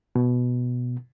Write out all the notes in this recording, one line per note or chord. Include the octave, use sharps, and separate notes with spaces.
B2